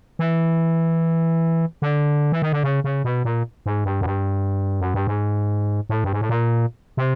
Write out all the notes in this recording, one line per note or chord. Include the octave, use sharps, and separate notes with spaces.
E3
D3
E3
D#3
D3
C#3
C#3
B2
A#2
G#2
G2
F#2
G2
F#2
G2
G#2
A2
G2
G#2
A2
A#2
C3